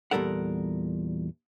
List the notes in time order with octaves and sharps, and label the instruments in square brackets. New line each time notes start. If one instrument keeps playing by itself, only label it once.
[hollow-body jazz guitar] E2 A#2 G3 A4 A#4 F#5